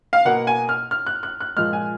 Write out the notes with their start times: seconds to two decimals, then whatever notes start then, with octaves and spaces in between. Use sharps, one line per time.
0.13 F5
0.25 B2 A#3 F#5
0.47 G#5
0.69 F6
0.91 F6
1.06 F#6
1.23 F#6
1.40 F#6
1.56 A#2 F3 G#3 F6
1.73 G#5